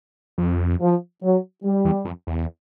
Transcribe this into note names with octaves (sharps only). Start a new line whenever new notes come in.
F2
F3
F#3
G3
E2
F2
E2